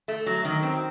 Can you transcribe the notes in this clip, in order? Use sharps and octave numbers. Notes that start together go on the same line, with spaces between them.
A3
F#3
D#3
C4